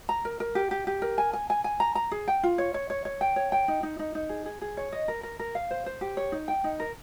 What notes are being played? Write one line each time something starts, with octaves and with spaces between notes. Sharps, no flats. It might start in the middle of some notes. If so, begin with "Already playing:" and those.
A#5
A#4
A#4
G4
G4
G4
A#4
G#5
G#5
G#5
G#5
A#5
A#5
G#4
G5
F4
C#5
C#5
C#5
C#5
G5
C#5
G5
D#4
D#4
D#4
D#4
G#4
G#4
G#4
C#5
D#5
A#4
A#4
A#4
F5
C5
C5
G4
C#5
D#4
G5
D#4
A#4